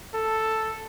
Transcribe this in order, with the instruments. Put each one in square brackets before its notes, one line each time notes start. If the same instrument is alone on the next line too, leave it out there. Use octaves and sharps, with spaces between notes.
[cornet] A4